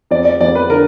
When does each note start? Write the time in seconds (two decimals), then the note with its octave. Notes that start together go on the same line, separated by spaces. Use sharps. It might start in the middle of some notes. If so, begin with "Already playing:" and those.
0.11 F2 D5
0.25 D5
0.41 F2 D5
0.55 B4
0.70 D3 A#4